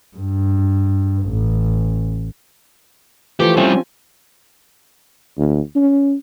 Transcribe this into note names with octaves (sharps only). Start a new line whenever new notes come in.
G2
A1
E3 F3 A3 G4
G3 C4 C#4 E4 G#5
D2
C#4